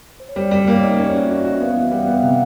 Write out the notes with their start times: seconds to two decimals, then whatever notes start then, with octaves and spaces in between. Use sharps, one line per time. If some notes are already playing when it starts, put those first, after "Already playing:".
0.20 C5
0.29 C#5
0.36 G3 C5 D5
0.51 G3
0.67 A#3
0.83 D#4
0.90 D#5
0.98 C#4 D5 E5
1.14 F#4
1.30 F#4
1.45 F#4
1.53 E5
1.60 B3 D#5 F5
1.76 E3
1.91 G3 E5 F#5
2.07 B3
2.18 F#5
2.22 C3 D#5 F5